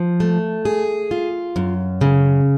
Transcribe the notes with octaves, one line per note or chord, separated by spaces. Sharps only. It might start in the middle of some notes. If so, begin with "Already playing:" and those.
Already playing: F3
A3
G#4
F4
F#2
C#3